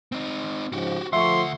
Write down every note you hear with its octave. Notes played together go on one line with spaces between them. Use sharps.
C4 D#4
G#2 C#3 F3 F#4 G4
D2 F3 A3 E5 F#5 C6 C#6